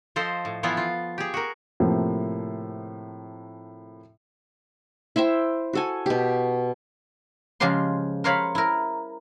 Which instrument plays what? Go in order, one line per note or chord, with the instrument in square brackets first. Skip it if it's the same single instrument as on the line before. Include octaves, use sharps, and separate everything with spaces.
[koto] F3 A4 C5 D#5
A2
E3 F3 B3 E4 F4
F4
G4 G#4
F#4 A#4
[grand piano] A2 C3 F3 A#3
[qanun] E4 C5 E5 G5
F#4 A4 G#5
B2 G4
[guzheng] C#3 F3 G#3 G4 C5 C6
A#4 C5 C#5 F5 B5
E4 A#4